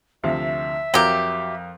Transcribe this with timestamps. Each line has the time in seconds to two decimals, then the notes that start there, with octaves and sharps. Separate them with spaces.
0.24 D2 C3 F3 E5
0.94 F2 F#3 G4 A#4 A#5